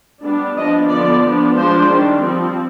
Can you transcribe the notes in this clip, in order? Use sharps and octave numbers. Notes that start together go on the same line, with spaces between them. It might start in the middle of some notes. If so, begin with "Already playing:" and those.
G3 B3 D4
F3 B3 D4 D#5
D3 F3 B3 D5
F3 B3 D4
F3 G#3 D4 C5
D#3 G3 D4
F3 C4